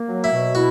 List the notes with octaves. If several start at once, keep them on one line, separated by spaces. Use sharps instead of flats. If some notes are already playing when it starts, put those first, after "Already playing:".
Already playing: A#3
F#3
E4
B2
E4 F#4